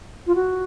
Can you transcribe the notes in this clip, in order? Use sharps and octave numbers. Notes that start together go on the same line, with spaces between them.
F4
F#4